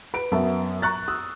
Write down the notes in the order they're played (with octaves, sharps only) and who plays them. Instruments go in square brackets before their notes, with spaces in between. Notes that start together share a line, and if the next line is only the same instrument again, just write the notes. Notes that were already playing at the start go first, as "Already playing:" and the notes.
[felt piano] B4 D7
F#2 B3 E5 A5
A#5 C#6 F#6 A6
D#6 E6